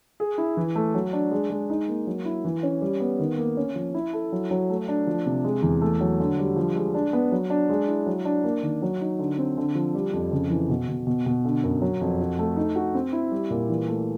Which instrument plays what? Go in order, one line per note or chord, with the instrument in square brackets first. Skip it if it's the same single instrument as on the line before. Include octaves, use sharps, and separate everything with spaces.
[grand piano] G#4
E4
E3
A3
F#3
D4
G#3
G#3
D#4
A#3
F#3
E4
E3
C#4
G3
B3
D#3
A#3
C#4
F3
E4
A4
F#3
F#3
A3
D4
F3
C3
G#3
E2
A3
F#3
D3
G3
F3
G#3
D4
B3
F#3
D4
G#3
E4
F#3
D4
A#3
D#3
F#3
D#4
D3
C4
D3
F3
G3
F2
C#3
E3
B2
B2
B2
B2
D3
F#2
F#3
F2
F#4
A3
D#4
F#4
C4
E4
G3
A#2
E3
A3